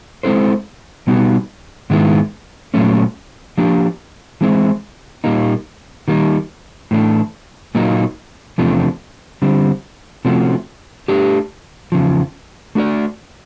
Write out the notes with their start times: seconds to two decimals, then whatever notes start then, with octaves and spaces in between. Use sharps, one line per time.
0.23 G#3 C4 E4 A4 C5
1.07 B2 G3 B3 D#4 F#4
1.90 G#2 D#3 G#3 B3 E4
2.74 A#2 F#3 A3 C#4
3.58 F3 A#3 D4 G4
4.41 E3 G#3 C4 E4
5.24 A#2 G3 A#3 D#4
6.08 D#3 G3 A#3 D#4
6.91 A2 E3 A3 D4
7.75 A#2 F#3 A#3 D#4
8.58 E2 C3 F3 A3 D4
9.42 D3 G3 C4
10.25 C3 F3 A3 C#4 F#4
11.08 A3 D4 G4
11.92 E2 C#3 F3
12.75 A3 D4 F#4 A#4 D5